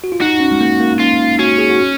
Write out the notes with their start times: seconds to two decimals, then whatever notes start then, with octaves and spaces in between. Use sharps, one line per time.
0.04 F#4
0.12 F4
0.21 D#4 F#4
0.40 C#4
0.52 G#3
0.61 A#3
0.80 A#3
0.99 C#4 F4
1.39 C#4 F#4
1.58 G#4
1.70 F#4